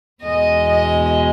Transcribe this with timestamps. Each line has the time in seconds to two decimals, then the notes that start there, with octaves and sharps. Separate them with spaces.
0.23 E2 B2 G#3 D#5
0.69 D#5